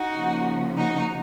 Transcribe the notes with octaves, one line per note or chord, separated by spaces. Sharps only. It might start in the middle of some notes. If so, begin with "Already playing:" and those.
Already playing: D#4 F#4
C#3 F3 A#3
D#4 F#4